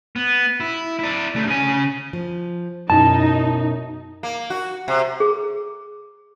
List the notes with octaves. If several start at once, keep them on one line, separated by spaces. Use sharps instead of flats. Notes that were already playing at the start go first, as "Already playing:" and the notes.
B3
E4
E4 D5
C#2 A3
C#3 G#5
F3
F#2 B2 D#4 E4 A5
A#3
F#4
C3
G#4